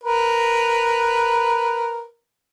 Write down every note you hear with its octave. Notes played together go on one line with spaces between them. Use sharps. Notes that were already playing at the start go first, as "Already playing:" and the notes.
A#4 B4